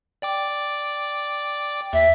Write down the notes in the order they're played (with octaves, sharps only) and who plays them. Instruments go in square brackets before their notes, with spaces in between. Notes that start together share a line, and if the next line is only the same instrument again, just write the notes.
[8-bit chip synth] D5 G5 D6
[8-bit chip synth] D#2 [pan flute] E5